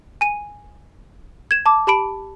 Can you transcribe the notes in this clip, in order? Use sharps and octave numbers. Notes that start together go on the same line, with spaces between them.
G#5 D#7
G#6 E7
A5 D6
G4 A5 B5 D7